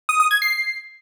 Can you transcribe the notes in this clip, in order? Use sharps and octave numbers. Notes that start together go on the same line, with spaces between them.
D#6
D#6
G#6
C7